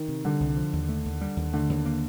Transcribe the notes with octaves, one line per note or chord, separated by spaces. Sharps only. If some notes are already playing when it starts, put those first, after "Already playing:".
Already playing: D#3
C3
D3 G3
C2
F3
D#2
A3
D#2
G3
D#2
D3 A3
D#2
A#3